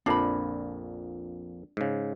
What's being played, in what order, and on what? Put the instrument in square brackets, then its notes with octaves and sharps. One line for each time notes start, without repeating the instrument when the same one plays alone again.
[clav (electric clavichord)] A#1 F2 A#2 [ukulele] D4 B5
[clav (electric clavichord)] G#2 C#3